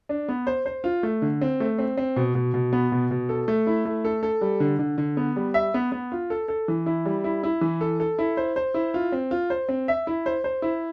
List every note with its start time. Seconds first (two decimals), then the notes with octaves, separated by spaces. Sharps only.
0.09 D4
0.29 B3
0.47 C5
0.66 C5
0.84 F4
1.03 A3
1.22 D3
1.41 C4
1.60 A3
1.78 C4
1.97 C4
2.16 B2
2.35 B2
2.54 B2
2.73 B3
2.92 B2
3.11 B2
3.29 A4
3.48 A3
3.67 E4
3.85 A3
4.05 A4
4.23 A4
4.41 G3
4.60 D3
4.79 D3
4.98 D3
5.17 B3
5.36 G3
5.54 E5
5.74 B3
5.92 B3
6.12 F4
6.30 A4
6.48 A4
6.68 E3
6.86 E4
7.05 G3
7.24 E4
7.43 E4
7.61 E3
7.81 A4
8.00 A4
8.19 E4
8.37 C5
8.56 C5
8.74 E4
8.94 F4
9.12 C4
9.31 F4
9.50 C5
9.68 C4
9.88 E5
10.07 E4
10.26 C5
10.44 C5
10.62 E4